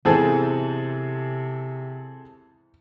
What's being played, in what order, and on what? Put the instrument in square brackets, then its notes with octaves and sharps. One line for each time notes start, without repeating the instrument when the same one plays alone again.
[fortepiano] E2 G#2 [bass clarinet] C3 [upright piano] C4 G#4 A4